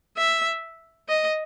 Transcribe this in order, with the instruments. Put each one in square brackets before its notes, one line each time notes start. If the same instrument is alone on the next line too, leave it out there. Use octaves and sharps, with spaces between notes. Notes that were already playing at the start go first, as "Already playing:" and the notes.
[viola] E5
D#5